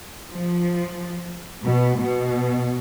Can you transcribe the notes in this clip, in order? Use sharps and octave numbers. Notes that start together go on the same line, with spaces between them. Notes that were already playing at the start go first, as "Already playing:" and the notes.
F3
B2
B2